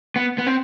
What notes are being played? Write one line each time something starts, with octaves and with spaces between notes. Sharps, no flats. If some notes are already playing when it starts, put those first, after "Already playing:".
B3
B3
C4